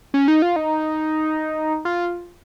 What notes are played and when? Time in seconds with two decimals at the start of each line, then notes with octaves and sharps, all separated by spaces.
0.14 C#4
0.28 D#4
0.42 F4
0.56 D#4
1.85 F4